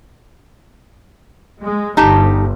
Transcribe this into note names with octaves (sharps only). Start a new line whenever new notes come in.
G#3
G1 D#4 G4 A5